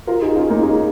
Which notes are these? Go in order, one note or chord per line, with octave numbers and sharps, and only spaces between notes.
F4 A#4
D#4 G#4
C#4 F4
A#3 D#4
D#4 G#4